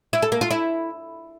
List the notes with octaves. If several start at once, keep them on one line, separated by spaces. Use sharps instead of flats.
E4
A4
A#3
F4
E4